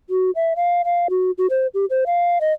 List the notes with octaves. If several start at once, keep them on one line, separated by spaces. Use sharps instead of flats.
F#4
E5
F5
F5
F#4
F#4
C5
G4
C5
F5
D#5